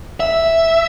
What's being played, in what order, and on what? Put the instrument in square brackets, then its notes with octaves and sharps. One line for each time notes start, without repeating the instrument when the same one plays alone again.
[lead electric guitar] E5